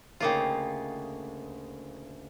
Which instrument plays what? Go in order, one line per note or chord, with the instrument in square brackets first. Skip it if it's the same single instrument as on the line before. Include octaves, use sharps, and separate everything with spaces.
[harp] D2 D#4 G5 [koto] C#3 A#3 F4